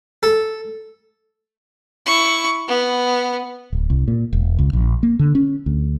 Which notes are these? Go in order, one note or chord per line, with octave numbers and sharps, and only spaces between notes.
A4
E4 C#6
B3
D1
C2
A#2
E1
C#2
A#1
A#3
D3
C#4
D2